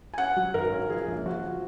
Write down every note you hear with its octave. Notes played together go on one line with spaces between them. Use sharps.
G#5
C#4 F#5
F#3
G#1 A#4
C#4
F3 G#4
A#1
F3 F#4
F3